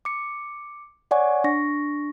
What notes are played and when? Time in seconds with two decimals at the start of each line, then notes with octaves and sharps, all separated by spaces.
0.05 D6 C#7
1.11 C#5 D5 F#5 G#5 C#6
1.44 D4 C#6 A#6